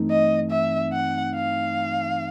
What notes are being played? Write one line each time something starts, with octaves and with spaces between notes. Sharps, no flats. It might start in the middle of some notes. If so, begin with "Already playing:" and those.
Already playing: G2 E3 A3 C4 D#4
D#5
E5
F#5
F5